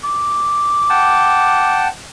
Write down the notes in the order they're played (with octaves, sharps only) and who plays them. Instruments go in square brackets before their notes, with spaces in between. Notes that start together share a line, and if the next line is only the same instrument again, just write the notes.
[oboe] D6
[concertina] F#5 G5 A5